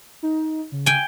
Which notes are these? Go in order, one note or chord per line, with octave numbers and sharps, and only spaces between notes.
D#4
C#3
G5 G#5